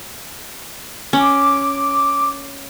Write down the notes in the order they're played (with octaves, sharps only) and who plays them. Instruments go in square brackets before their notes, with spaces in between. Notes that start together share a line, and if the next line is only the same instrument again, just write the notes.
[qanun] C#4 [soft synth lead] D6